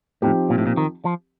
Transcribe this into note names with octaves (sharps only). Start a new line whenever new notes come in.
A2 F3 C4 D#4 G4
A#2
A2
A#2
D#3
F3